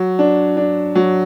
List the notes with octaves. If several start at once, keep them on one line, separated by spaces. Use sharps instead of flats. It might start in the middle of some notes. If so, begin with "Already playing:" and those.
Already playing: F#3
D4
D4
F#3